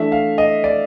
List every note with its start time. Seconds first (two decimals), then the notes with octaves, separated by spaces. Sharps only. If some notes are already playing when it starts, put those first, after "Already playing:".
Already playing: E3 A3 D4 E5
0.12 F5
0.38 D#5
0.64 D5